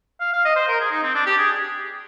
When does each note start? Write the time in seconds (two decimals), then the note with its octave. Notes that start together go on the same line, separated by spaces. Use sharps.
0.20 F5
0.33 F5
0.45 D#5
0.56 C5
0.68 A#4
0.80 G#4
0.91 D#4
1.03 C4
1.15 D4
1.26 G4
1.38 G#4